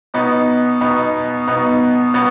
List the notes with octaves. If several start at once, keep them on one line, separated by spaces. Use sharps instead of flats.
B2 B3 D#4
B2 B3 D#4
B2 B3 D#4
B2 B3